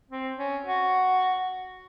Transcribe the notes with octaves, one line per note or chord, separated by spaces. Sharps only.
C4
C#4
F#4